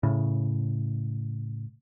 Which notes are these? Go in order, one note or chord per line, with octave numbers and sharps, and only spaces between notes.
A2 C#3